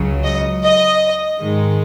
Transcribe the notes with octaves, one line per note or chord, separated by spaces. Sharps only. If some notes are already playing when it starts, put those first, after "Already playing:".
Already playing: C#2 C#3 F#3
D#5
D#5
G#2 D#3 G#3